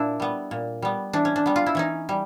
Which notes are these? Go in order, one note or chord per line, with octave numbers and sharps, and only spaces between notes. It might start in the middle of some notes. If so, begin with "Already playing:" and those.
Already playing: A#2 D4 E4
G3 B3
A#2
G3 B3
E3 D4
C#4
D4
G3 B3
F4
E4
E3 C#4 D#4
G3